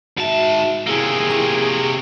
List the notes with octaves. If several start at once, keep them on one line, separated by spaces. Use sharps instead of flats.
G#2 F#4 E5 A5
C3 A#3 E4 G#4
C#6